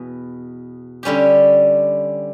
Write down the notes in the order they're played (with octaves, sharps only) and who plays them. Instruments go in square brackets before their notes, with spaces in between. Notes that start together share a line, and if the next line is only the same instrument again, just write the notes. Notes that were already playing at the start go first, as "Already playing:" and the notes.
Already playing: [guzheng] E2 B2
D3 G3 C#4 G4